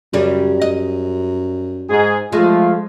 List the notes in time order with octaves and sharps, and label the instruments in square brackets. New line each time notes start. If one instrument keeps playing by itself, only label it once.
[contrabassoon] F#2 [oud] C#3 G3
[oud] D#5
[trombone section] G#2 G#4
[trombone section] F3 A3 F4 [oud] G#3